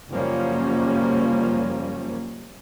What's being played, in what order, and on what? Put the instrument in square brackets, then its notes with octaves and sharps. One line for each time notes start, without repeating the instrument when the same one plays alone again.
[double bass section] F#1 F#2 F3 G3 A#3 C#4